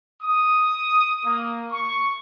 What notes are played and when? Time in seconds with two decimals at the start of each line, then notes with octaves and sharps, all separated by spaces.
0.22 D#6
1.24 A#3
1.71 C#6